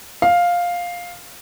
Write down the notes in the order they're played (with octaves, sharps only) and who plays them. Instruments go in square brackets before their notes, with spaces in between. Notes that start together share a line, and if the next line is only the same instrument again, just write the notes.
[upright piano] F5